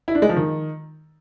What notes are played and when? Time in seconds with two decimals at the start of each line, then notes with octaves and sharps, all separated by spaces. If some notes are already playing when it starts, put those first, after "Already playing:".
0.08 E4
0.15 D4
0.22 G#3
0.29 F3
0.36 D#3